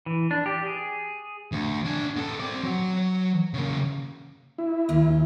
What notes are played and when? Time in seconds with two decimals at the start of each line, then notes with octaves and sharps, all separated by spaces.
0.06 E3
0.31 D4
0.46 G4
0.66 G#4
1.52 D2
1.85 D4 G#5
2.17 B3 A4
2.40 C4 D5
2.63 F#3
3.54 C#3 A#3
4.58 E4
4.89 D#2 F4